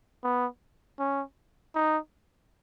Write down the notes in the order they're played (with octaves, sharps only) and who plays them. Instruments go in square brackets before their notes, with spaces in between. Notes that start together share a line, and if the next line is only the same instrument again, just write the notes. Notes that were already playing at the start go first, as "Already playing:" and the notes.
[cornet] B3
C#4
D#4